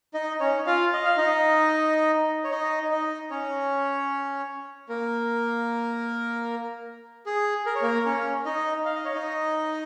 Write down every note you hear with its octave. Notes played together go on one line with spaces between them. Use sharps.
D#4 D#5
C#4 C#5
F4 F5
D#5
F5
D#4 D#5
C#5
D#4 D#5
D#4 D#5
C#4 C#5
A#3 A#4
G#4
A#4
C#5
A#3 A#4
C#4 C#5
D#4 D#5
F5
D#5
C#5
D#4 D#5